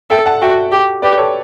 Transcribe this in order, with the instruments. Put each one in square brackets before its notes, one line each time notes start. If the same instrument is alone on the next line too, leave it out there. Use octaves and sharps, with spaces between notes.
[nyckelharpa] A4 [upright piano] E5 G5
[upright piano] F#5 A5
[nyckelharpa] F#4 [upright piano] E5 G5
[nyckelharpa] G4
[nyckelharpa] G4 [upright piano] B4 D5
[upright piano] A4 C#5